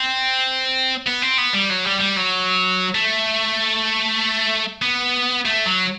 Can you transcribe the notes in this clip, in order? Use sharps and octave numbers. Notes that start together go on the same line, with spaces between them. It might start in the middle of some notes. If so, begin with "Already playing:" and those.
Already playing: C4
B3
C4
B3
G3
F#3
G3
G3
F#3
A3
B3
A3
F#3